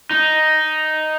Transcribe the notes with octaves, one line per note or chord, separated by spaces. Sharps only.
D#4